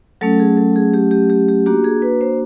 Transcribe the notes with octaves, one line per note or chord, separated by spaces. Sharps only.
F#3 A3 C#4 A4
G#4
A4
G#4
G4
G4
G4
G4
A#3 D4 F#4 G4
G#4
B4
C5